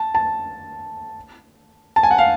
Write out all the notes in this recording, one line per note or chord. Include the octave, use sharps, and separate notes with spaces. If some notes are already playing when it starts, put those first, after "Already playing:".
Already playing: A5
A5
A5
G#5
F#5
F5